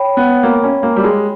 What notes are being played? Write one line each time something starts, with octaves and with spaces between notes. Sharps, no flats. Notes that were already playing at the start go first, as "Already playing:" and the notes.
Already playing: C#5 G5 B5
B3
A#3
C#4
A#3
G3
G#3